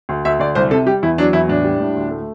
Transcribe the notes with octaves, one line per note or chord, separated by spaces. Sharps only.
D2
D2 E5
D2 D5
C2 C5
C3 A4
G3 G4
E2 E4
F#3 D4
E2 E4
A2 D4
G3
A2
D2
A3